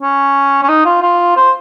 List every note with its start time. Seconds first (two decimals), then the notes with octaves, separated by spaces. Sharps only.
0.02 C#4
0.63 C#4
0.69 D#4
0.85 F4
1.02 F4
1.36 C5